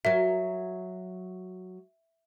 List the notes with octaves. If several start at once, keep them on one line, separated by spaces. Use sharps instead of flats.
F#3 F#4 A#4 E5